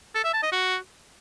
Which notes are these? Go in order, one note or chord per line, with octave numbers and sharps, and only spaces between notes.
A4
E5
A5
D#5
F#4